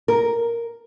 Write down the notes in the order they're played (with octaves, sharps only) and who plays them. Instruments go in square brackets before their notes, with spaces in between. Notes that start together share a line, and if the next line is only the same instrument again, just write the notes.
[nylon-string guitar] A#4